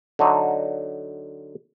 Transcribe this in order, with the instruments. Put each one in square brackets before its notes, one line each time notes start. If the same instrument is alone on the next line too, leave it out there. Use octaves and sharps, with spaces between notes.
[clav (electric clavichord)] D3 F#3 D#4